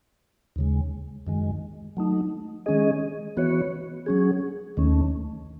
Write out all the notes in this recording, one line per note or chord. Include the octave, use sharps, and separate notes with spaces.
D#2 C#3 G#3
F#2 D#3 G#3
F#3 A3 D#4
D#3 G#3 C#4 G#4 D#5
E3 B3 F#4 C#5
F#3 C#4 G#4
D#2 D#3 A3 C#4